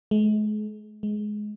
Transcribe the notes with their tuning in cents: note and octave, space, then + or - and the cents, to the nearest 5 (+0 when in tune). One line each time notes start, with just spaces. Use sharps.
G#3 +40
G#3 +15